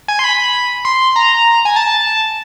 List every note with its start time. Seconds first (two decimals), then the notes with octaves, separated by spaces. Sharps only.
0.08 G#5
0.19 C6
0.24 B5
0.85 C6
1.16 A#5
1.65 G#5
1.76 A5